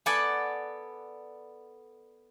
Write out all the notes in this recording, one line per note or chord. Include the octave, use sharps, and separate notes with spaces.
B3 A4 B4 D5 F#5 G#5